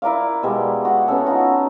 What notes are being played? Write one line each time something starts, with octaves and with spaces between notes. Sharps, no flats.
E4 A#4 D5 F5
B2 G3 G#3
F#4 F#5
B3 C#4 A4
D#4 F4 F#4